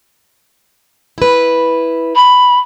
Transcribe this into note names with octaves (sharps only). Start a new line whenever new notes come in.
E4 B4
B5